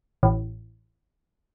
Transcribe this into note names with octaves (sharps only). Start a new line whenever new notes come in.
A1